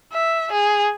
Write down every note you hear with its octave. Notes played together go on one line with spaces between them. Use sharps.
E5
G#4